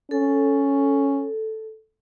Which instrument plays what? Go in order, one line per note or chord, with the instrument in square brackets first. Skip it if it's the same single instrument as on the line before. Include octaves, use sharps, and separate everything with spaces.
[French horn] C#4 [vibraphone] A4